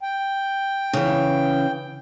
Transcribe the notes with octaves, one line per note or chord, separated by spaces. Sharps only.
G5
C#3 E3